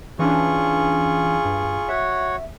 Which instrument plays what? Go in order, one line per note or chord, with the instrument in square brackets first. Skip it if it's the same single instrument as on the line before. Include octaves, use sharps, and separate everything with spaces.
[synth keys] E3 C#4 D4 [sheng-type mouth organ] F4 G#4 C#6
[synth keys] G2
[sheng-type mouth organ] F#4 C#5 F#5 [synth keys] E5